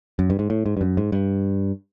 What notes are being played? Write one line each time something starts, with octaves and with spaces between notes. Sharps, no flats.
F#2
G2
G#2
A2
G#2
G2
F#2
G#2
G2